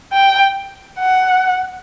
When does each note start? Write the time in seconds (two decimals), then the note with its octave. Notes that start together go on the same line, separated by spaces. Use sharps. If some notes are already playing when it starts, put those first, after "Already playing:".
0.13 G5
1.00 F#5